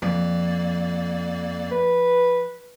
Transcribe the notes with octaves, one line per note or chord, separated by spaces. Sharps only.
F2 F3 A#3 D5
B4